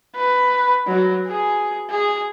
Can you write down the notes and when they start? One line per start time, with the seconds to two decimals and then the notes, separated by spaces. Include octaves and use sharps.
0.15 B4
0.87 F#3
1.27 G#4
1.90 G#4